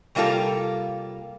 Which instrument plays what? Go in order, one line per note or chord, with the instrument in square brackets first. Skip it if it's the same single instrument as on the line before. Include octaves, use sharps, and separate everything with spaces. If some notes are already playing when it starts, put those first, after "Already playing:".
[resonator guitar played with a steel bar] C3 G3 A#3 F4 A4